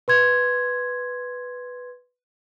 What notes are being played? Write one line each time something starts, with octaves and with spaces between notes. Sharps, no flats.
B4 C6 G#6